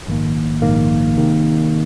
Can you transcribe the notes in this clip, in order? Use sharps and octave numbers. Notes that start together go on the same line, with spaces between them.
A#1 G#2 D#3 A#3
A#1 G#2 D#3 A#3
C3 D#3 A#3